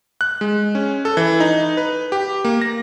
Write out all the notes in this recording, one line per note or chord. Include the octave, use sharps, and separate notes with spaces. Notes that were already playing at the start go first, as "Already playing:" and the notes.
F#6
G#3
C#4
A4
E3
D#4
B4
G4
A#3
A#6